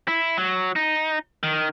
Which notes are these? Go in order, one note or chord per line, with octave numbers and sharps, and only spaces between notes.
E4
F#3
D#4
D#3